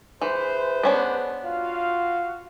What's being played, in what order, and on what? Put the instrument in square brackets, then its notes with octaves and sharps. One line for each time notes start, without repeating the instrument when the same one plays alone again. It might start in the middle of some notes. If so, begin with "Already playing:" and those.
[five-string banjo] E3 [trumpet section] G#4 B4 C5
[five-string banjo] B3 C#4 D4
[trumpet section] F4 F#4 F5